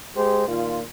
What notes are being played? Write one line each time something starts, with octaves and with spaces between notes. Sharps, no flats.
G#3 G4 G#4 C5
A#2 D#3 F4